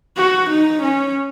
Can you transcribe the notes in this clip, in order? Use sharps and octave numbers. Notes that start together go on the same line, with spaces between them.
F#4
D#4
C#4